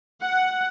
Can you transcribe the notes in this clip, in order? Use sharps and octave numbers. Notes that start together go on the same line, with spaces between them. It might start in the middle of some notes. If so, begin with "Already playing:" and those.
F#5